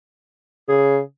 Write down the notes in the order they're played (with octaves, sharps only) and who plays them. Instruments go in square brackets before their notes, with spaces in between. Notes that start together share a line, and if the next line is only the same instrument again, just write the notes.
[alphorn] C#3 [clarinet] G#4